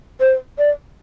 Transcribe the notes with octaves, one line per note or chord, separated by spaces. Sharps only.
C5
D5